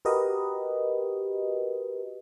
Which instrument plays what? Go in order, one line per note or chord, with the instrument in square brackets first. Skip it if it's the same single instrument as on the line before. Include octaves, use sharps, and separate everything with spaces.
[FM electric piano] F#4 G4 A#4 B4 D#5